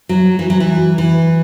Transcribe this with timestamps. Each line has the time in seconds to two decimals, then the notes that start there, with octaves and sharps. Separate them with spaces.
0.09 F#3
0.39 E3
0.50 F#3
0.60 E3
0.98 E3